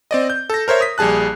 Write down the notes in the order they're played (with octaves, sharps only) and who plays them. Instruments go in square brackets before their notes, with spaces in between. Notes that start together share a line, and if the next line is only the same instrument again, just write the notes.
[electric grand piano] C4 D5 D#5
G6
A4 A#6
A#4 C5 C#5 E5
D#6 B6
A#1 G3 G#4 A5 F#6